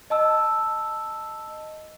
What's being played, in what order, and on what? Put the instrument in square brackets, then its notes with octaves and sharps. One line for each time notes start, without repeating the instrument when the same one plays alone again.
[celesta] D#5 A5 E6